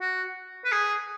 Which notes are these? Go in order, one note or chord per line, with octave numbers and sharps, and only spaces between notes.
F#4
B4
G#4